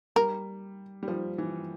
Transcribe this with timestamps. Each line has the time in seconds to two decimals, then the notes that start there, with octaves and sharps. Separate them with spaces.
0.16 G3 A#4
1.03 G3
1.08 F3
1.38 E3